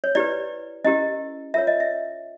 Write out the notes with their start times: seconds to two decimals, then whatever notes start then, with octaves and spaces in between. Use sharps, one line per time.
0.04 C#5
0.15 E4 G4 B4 D5
0.85 C#4 E4 G4 A#4 D#5
1.54 F4 A#4 C#5 E5
1.67 D#5
1.80 E5